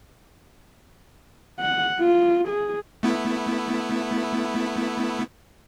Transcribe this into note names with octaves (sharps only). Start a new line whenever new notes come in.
F#5
F4
G#4
A3 B3 E4